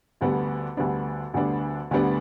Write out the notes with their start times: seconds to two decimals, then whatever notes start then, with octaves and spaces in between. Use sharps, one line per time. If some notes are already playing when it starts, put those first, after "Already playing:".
0.21 D2 D3 G3 B3 D4
0.77 D2 D3 G3 B3 D4
1.34 D2 D3 G3 B3 D4
1.91 D2 D3 G3 B3 D4